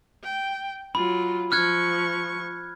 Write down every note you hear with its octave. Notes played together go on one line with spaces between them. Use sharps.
G5
F#3 F4 B5
F3 C#6 F6 F#6 G#6